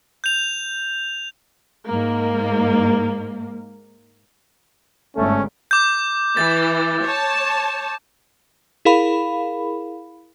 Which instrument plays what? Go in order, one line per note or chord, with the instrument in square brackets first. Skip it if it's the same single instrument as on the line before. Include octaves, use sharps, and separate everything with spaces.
[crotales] G6 F7
[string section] G#2 A#3
[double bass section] G1 G#2 [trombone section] A3 [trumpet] C#4
[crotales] D6 G6
[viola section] E3 [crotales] A6
[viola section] C#5 A5
[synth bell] E4 G#4 A#4 F5 B5